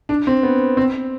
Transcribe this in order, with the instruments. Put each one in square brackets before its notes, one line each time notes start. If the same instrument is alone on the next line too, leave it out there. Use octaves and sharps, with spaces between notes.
[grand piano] D4
C4
B3
C4